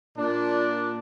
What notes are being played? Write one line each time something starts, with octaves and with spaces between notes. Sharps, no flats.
A#2 D4